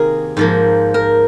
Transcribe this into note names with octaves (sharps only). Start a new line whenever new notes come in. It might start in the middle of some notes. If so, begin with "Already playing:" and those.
Already playing: C3 D#3 A#3 G#4 A#4
G#2 F3 A#3
A#4